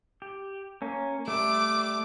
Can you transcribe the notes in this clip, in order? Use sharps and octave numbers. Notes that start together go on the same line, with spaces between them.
G4
A#3 C#4
G3 A3 D6